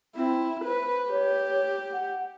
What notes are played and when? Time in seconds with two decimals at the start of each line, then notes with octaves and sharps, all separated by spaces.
0.16 C4 E4
0.65 B4 C5
1.10 G4 C#5
1.92 F#5